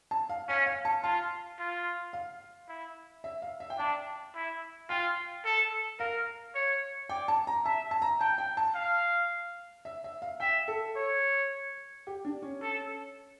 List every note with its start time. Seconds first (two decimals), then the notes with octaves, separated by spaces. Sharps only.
0.11 A5
0.30 F5
0.48 C#4 F5
0.66 F5
0.85 A5
1.03 F4 A5
1.59 F4
2.13 F5
2.69 E4
3.24 E5
3.42 F5
3.60 E5
3.70 G5
3.79 D4 A5
4.35 E4
4.89 F4 G5
5.45 A4
5.99 A#4 F5
6.55 C#5
7.09 D5 G5
7.28 A5
7.47 A#5
7.65 E5 A5
7.91 A5
8.02 A#5
8.20 G5 A5
8.38 G5
8.57 A5
8.75 F5
9.85 E5
10.04 E5
10.22 F5
10.40 E5 G5
10.68 A4
10.96 C#5
12.07 G4
12.25 D4
12.42 C#4
12.62 A4